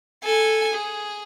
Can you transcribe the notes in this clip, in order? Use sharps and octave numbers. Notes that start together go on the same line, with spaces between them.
A4 G#5
G#4